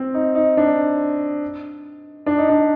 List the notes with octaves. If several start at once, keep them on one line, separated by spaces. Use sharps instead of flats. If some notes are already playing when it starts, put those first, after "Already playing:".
Already playing: C4
D#4
D#4
D4
D4
D#4
D4